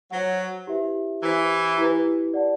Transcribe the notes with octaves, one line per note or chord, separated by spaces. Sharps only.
F#3 F#4 C5 F#5
E4 G4 B4 E5
E3 E4 G4 C5
E4 G4 B4
G4 D5 F#5 A5